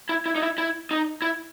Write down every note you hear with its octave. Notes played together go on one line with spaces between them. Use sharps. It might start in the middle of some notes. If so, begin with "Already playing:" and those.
E4
E4
D#4
E4
E4
D#4
E4